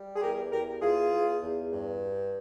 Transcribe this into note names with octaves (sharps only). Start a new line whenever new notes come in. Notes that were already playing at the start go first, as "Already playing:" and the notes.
Already playing: G3
G#4
E2 G4 A#4
E2 G4 A#4
E2 F4 G#4
E2
E2
G2